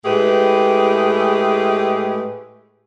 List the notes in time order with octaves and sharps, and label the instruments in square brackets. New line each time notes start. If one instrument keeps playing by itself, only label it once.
[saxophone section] A2 G#3 A3 G4 G#4 B4